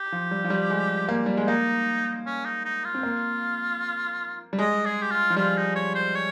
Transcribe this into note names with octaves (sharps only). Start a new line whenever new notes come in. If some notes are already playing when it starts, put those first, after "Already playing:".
Already playing: G4
F3
G3
F3
G3
G#3
A#3
G3
G#3
A#3 D#4
C#4
D#4
D#4
F4
C4
A#3
G3
G#3 D#5
G#4
G4
F4
F3
G3 F4
D#4
C#5
C5
C#5